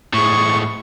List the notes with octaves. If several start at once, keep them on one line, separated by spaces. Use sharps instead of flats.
A2 G#3 C#6